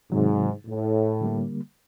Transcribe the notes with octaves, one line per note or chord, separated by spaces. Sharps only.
G#2 C3 D#3 F#3
A2
D3 G3 A#3